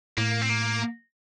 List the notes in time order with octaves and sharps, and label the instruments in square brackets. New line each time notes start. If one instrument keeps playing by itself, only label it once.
[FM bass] A2 [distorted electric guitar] A#3
[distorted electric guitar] C4
A#3